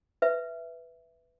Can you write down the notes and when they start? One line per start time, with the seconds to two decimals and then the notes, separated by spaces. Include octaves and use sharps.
0.22 B4 E5